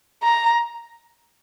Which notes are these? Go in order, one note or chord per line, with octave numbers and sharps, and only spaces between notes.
A#5